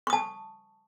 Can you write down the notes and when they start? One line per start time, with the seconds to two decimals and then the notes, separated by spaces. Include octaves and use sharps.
0.07 C#6
0.10 D#6
0.13 A5